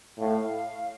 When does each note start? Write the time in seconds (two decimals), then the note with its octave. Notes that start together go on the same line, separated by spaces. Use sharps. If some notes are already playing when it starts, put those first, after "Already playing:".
0.18 A2 F5